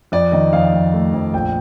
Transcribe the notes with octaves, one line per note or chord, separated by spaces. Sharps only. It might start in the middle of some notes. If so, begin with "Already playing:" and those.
F2 D5
D#3 D#5
F2 F5
F2
A3
F2
A#1 G5